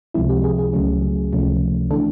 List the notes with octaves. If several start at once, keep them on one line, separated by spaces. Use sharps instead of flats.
C#2 C3 F3 G#3 C4 E4
G4
G#4
G#4
C#2 C#3 F#3 A3 C#4
C#2 C3 F3 A3 C#4
C#3 E3 A3 D4 A4